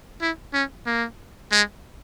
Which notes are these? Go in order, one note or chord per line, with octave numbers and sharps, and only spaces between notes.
E4
C#4
A#3
G#3